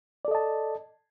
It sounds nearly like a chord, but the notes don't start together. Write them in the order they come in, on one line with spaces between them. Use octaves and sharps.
D5 A4 D#5 A5